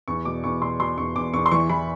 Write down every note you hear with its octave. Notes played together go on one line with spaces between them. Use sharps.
E2 C#6
B2 D6
E2 C#6
B2 C6
B2 C6
E2 C#6
E2 D6
E2 C#6
C6
E3 C#6
E3 B5